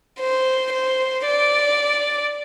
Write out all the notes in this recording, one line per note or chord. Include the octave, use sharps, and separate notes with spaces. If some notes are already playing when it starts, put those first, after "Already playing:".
C5
C5
D5